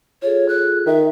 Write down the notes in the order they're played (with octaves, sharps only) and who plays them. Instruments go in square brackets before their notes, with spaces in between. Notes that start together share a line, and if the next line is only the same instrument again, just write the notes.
[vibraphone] F4 G#4 A4 [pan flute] C#5
[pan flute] F#6
[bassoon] D#3 [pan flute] E5